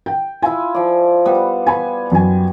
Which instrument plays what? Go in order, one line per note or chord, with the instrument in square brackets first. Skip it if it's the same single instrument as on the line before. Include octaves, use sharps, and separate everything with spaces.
[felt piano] G5
[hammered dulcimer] E4 F4 [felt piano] G#5
[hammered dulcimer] F3 D5
G3 B3
[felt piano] G#5 B5
F#2 G#5